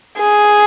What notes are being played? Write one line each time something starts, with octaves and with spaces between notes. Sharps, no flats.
G#4